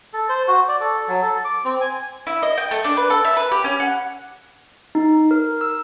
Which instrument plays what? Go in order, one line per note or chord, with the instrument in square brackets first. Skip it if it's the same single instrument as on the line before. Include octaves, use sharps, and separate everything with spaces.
[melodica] A4
C5
F#4
D5
A4
F#3
A4
D6
C4
G#5
[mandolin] E4
D#5
G5
A3
D4
B4
A4
E5
B4
G4
C#4
F#5
[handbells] D#4
A#4
E6